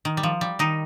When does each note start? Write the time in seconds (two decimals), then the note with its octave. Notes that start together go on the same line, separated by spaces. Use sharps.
0.05 D#3
0.17 G3
0.23 F3
0.41 G3
0.59 D#3 D#4